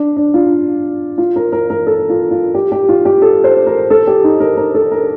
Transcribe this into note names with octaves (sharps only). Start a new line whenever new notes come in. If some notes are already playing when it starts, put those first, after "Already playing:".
Already playing: D4
D4
F4
F4
A#4
A#4
A#4
A4
F4
F4
G4
G4
F4
G4
A4
C5
A#4
A4
G4
D#4
A#4
A#4
A4
A#4